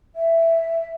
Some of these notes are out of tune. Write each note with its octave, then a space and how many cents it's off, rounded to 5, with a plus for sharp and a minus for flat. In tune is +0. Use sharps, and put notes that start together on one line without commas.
E5 +5